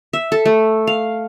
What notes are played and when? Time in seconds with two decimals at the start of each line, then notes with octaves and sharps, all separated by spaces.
0.13 E5
0.32 A4
0.46 A3
0.87 F5